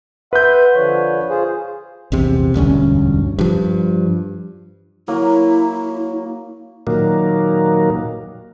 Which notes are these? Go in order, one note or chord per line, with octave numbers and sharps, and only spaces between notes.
B4 E5 F#5 C6 G6
D3 F3 C#5
F4 G#4 C5
A#1 E2 C3
E1 D2 G2 C#4
G2 F3
F#3 A#3 E4
A#2 D#3 F#3 A#3